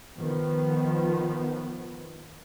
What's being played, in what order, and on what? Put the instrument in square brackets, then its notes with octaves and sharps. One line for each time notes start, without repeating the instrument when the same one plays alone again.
[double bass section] D#3 F3 B3